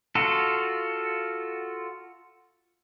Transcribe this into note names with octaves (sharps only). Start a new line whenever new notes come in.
F4 F#4 A4